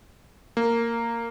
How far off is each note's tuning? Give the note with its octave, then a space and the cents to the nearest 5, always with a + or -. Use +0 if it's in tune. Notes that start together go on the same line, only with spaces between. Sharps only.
A#3 -10